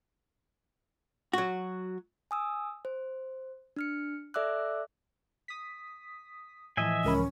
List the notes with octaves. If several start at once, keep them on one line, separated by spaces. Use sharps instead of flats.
F#3 F#4
G#5 D#6 E6
C5
D4 F6 C#7
A4 D5 E5 D6 E6 F#6
D#6 B6
A2 E3 F3 D#5 E5 G#5
C#2 C#4 A#4 B5